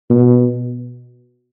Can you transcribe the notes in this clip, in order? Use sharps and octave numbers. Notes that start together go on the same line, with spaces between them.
B2